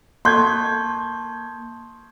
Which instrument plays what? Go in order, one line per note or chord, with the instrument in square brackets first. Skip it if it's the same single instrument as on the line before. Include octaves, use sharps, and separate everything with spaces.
[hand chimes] A#3 A5 C#6 [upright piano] C6 G6 G#6